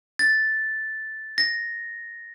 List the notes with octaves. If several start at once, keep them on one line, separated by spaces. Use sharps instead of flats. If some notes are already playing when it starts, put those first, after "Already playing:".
A6
A#6